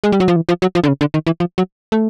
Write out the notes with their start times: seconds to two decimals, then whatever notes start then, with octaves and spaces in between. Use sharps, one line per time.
0.04 G#3
0.12 G3
0.20 F#3
0.28 F3
0.36 E3
0.49 F3
0.62 F#3
0.75 F3
0.84 D3
0.88 C#3
1.01 D3
1.14 D#3
1.27 E3
1.40 F3
1.58 F#3
1.92 A3